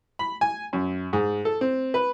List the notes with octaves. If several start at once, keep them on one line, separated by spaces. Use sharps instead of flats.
B5
G#5
F#2
G#2
A4
C4
B4